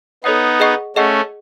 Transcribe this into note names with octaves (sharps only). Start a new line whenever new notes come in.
B3 D#4 A4 C#5 F#5
G#4 D#5 F#5 C#6
A3 C#4 G#4 D#5 F#5 C#6